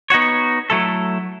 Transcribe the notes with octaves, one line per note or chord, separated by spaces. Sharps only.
B3 D#4 F#4 C#5
F#3 A3 E4 A4